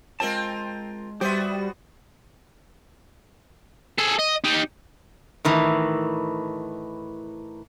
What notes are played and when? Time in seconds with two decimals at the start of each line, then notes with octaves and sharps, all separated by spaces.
0.20 G#3 C4 F4 A#4 A5
1.21 G3 B3 F#4 G4 C5 E5
3.99 G#4 A4
4.19 D#5
4.44 D#4 G4
5.45 A2 D#3 E3